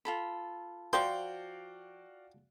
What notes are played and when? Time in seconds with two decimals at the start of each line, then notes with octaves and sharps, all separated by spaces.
0.05 F4 A4 B5
0.93 F3 F#4 C5 D5 F5 G5